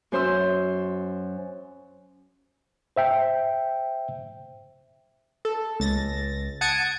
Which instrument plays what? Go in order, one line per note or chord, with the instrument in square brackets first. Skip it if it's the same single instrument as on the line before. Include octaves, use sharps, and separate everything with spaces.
[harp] F#2 C#4 C5 E5 C6 E6
[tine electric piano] C5 E5 G5
[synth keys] A4
C#2 A6 A#6
F#5 A5 D#6 G#6 C#7 D7